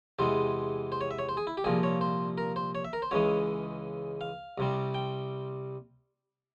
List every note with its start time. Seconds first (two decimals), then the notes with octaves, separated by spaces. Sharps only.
0.19 E2 C3 E3 G#3 C5
0.92 C5
1.01 C#5
1.11 E5
1.19 C#5
1.29 C5
1.37 G#4
1.47 E4
1.57 G4
1.64 C2 A#2 F3 G#4
1.83 C#5
2.01 C5
2.38 A#4
2.56 C5
2.75 C#5
2.85 E5
2.93 A#4
3.02 C5
3.11 C#2 C#3 E3 G#3 C#5
4.21 F5
4.58 C2 C3 G3
4.94 G5